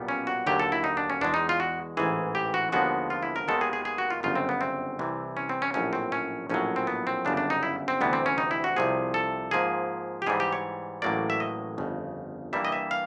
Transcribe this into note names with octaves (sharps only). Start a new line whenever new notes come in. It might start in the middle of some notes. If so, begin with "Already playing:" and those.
Already playing: B1 A#2 G3 B3
C#4
F#4
D#2 D3 F#3 G4
A4
E4
D#4
D4
C#4
E2 B2 G#3 D4
D#4
F4
F#4
A1 G#2 E3 G#4
G4
F#4
D#2 D3 F3 G#3 B3 F#4
F4
E4
A#4
D#2 D#3 G#3 B3 A4
G#4
G#4
G#4
F#4
F4
G1 F#2 C#3 F4
C4
B3
C4
C2 C3 E3
C#4
C4
C#4
A#1 A2 F#3 C#4
C4
C#4
A#1 A2 F#3 C#4
C4
B3
C4
G1 F#2 C#3 D4
D4
D#4
E4
C4
D2 C3 E3 G3 B3
C4
C#4
D#4
E4
F#4
C2 C3 F3 G#4
A4
G#2 F3 A#3 G#4
G4
G#2 E3 G3 G#4
G4
C#5
A1 A2 F#3 A#3 D5
E5
D#5
G1 F2 C#3
G2 E3 G3 A#3 E5
D#5
E5
F5